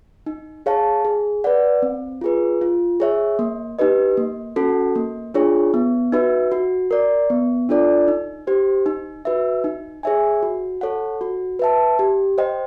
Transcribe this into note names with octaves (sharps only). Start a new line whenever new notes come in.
D#4
G#4 C#5 F5 A5
G#4
B4 D5 F#5
C4
F4 G#4 B4
F4
G#4 C#5 E5
A#3
D#4 G4 B4 D#5
A#3
C#4 F#4 A4
A#3
D4 F4 G#4 C#5
B3
D#4 F#4 B4 E5
F#4
A#4 D5
B3
D4 F4 A4 D5
D#4
G4 C5
D#4
F#4 B4 E5
D#4
G#4 C#5 E5 G#5
F#4
A4 C#5 F#5
F#4
B4 E5 A5
G4
C5 D#5 G5